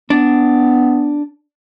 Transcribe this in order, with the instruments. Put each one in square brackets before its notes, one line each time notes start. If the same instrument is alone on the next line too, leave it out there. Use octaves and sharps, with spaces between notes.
[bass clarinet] B3 [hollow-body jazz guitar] D4